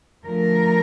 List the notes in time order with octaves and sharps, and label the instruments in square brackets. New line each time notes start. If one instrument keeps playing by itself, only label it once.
[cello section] D3 F3 A3 A#4